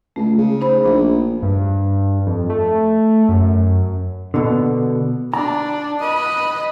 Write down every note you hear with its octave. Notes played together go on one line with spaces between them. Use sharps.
C#2 A3
C#3
D#4 C5 B5
A#1 D4
G2
F2
A3
F#2
B2 D3
D4 A#5
B4 D#5